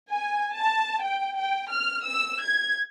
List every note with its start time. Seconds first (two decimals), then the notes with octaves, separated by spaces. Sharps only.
0.11 G#5
0.54 A5
1.03 G5
1.39 G5
1.72 F6
2.06 E6
2.43 G#6